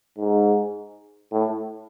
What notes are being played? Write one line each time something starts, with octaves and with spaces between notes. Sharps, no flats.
G#2
A2